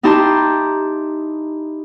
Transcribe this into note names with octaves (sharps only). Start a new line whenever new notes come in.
D#4 E4 G4 A5 A#5 C6